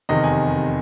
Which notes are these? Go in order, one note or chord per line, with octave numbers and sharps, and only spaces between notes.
F1 E2 C3 D#3 D#5
G#5